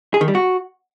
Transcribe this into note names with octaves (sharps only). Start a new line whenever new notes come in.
G#4
D#3
G3
F#4